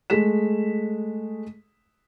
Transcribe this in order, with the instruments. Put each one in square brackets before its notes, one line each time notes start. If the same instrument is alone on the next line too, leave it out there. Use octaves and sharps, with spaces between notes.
[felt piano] G#3 A3 B6 E7